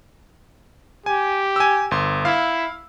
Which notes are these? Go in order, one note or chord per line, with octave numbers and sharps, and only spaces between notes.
G4 G#5
G#5 E6
G1 C6
E4 F5